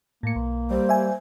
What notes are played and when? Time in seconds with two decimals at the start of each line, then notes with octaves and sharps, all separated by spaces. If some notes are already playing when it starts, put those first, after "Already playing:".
0.23 A2 A#3 C#7
0.36 B1
0.71 G3 C5
0.89 E5 G#5